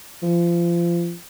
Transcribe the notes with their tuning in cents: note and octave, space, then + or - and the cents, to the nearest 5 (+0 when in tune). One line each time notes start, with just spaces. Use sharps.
F3 -30